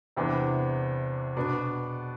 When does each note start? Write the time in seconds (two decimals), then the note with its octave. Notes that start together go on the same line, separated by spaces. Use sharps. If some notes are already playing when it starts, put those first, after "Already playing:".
0.17 E2 C3 E3 B3 D4
1.37 B2 B3 D4